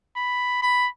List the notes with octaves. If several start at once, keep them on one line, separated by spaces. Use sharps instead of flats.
B5
B5